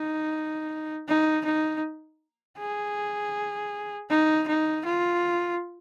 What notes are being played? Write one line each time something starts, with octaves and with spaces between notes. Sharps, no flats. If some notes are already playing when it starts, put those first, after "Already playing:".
Already playing: D#4
D#4
D#4
G#4
D#4
D#4
F4